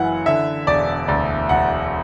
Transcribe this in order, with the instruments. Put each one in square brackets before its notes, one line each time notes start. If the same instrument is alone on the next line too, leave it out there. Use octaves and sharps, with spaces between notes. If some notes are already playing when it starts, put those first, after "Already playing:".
Already playing: [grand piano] F#1 F#2 E3 F#5 G#5
D3 E5
E1 D5
D2 D5
E1 F#5